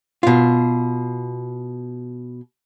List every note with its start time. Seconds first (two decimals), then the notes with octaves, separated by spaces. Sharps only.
0.23 B2 F4